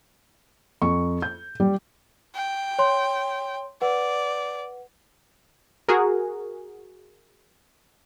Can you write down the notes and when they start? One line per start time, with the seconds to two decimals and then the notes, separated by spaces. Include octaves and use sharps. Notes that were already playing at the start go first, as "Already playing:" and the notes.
0.82 F2 C#6
1.22 G6
1.60 G3
2.35 G5
2.79 C#5 C6
3.82 B4 D5 F#5
5.88 F#4 G#4 A#4